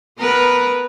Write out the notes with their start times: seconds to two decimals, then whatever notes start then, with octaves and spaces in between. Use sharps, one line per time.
0.19 B3 A#4 B4